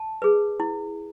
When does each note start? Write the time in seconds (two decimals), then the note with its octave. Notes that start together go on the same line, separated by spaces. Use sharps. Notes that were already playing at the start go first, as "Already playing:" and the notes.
Already playing: A5
0.22 G#4 B4
0.60 E4